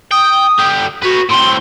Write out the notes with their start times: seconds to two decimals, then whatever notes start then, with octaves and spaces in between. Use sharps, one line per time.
0.11 G5 D#6
0.59 D3 G4
1.03 F#4 B4 C#5
1.30 A2 C4 C6